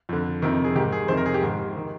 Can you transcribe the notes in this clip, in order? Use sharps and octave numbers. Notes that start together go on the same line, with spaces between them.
F2 D3
F2 C3 D#3 A#4
G#4
G#2 D#3 G4
G#4
F2 C3 D#3 C5
A#4
G#4
G4
G#2 D#3
D#3